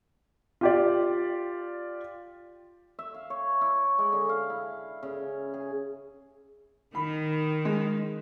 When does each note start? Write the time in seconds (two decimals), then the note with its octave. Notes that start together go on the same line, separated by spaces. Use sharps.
0.61 F4 G4 D5
2.99 E5
3.14 F5
3.30 C#5
3.61 E4
3.98 G#3
4.13 D3
4.29 F5
4.50 E4
5.03 C#3
5.54 G#4
6.95 D#3 B5
7.65 G#3